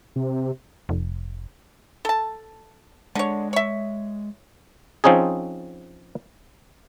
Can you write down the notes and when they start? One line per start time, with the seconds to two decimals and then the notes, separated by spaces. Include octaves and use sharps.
0.16 C3
0.89 F1
2.05 A4 A5
3.15 D3 G#3 C#5
3.53 C#5 E5
5.04 F3 C4 C#4 D#4 G#4